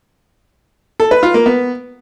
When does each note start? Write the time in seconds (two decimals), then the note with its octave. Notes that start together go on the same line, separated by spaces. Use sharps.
1.00 A4
1.11 B4
1.23 F4
1.34 A#3
1.46 B3